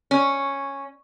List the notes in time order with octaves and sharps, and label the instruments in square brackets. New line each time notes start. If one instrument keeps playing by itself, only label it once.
[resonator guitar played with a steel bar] C#4